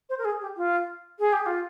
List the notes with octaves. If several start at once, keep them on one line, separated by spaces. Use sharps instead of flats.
C5
A#4
G#4
G4
F4
G#4
G4
F4